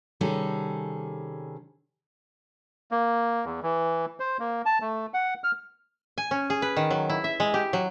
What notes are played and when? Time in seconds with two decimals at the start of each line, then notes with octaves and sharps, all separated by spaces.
0.21 C3 D#3 G3 C#4 G#4 A4
2.91 A#3
3.45 E2
3.63 E3
4.20 C5
4.40 A#3
4.66 A5
4.81 A3
5.14 F#5
5.44 F6
6.18 G#5
6.31 C#4
6.50 G#4
6.62 B4
6.76 D#3
6.90 F#3
7.09 E4
7.24 E5
7.40 G#3
7.54 G4
7.73 F#3